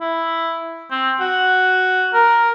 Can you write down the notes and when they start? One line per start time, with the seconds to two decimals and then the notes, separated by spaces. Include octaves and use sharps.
0.01 E4
0.91 C4
1.20 F#4
2.14 A#4